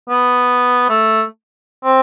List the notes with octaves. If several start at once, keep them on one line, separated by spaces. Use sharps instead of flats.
B3
A3
C4